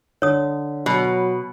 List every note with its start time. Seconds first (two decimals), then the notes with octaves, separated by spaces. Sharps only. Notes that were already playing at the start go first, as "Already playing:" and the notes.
0.22 D3 C#5 D#6
0.86 B2 F#3